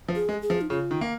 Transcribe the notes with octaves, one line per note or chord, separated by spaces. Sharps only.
F3
G#4
G#3
G#4
F3
D#4
C#3 F4
D#3
A#3